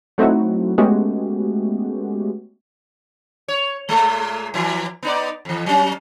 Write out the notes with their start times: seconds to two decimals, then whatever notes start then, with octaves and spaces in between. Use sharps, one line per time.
0.18 F#3 A3 C4 D#4 E4 F#4
0.78 G#3 A3 B3 C#4 F#4 G4
3.48 C#5
3.89 A#2 G#3 A3
4.54 E3 F3
5.03 B3 D#4 D5
5.45 F2 E3
5.66 F#3 C#4